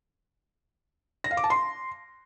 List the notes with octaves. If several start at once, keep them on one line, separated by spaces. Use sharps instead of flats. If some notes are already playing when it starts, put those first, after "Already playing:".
A#6
F5
D6
A5
C6